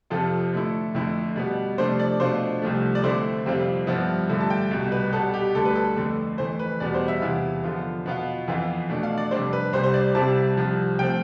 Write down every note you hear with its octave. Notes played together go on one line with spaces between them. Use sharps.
F2 C3 F3 C4 F4 A4
D3 A3 E4
F2 D3 A3 E4
B2 G3 B3
C3 F3 A3 D4 C5
D5
B2 A3 D4 F4 C5
C2 C3 F3 A3
D5
D3 A3 C4 E4 C5
F2 C3 G3 C4 F4
G2 F3 B3 E4
G2 D3 A3 E4
A5
G5
C2 B2 G3
B4
B2 G3 B3 A4
G4
D2 D3 G3 A4
B4
A4
F2 D3 A3
F2 E3 A3 C5
B4
E2 B2 G3 B3 D5
C5
E5
E2 C3 E3 B3 E4 F5
D3 F3 B3 F4
B2 B3 F4
F2 E3 B3 F4
B2 A3 D4
F5
D5
F2 C3 G3 D4 C5
B4
C2 C3 G3 C5
C5
D5
C2 C3 G3 C4 E4 A5
C2 C3 F3
F3 A3 C4 G5